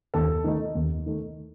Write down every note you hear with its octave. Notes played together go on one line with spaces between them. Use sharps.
D#2 A4 A5
D#3 A3 D#4
D#2
D#3 A3 D#4